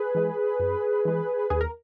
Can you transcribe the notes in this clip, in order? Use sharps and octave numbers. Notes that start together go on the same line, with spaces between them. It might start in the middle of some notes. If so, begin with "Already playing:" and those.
Already playing: G#4 B4
E3 G#3
F#2
E3 G#3
D#2 G#4
A#4